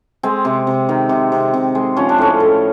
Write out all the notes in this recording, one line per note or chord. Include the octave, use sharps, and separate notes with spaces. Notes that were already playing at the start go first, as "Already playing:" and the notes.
G#3 C4
C3
C3
D#3
C3
C3
C3
G#3
F3 C#4
D4
A2 C#4
A2